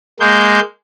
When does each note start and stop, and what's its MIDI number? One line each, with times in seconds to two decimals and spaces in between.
0.20 0.60 56
0.20 0.60 58
0.20 0.60 91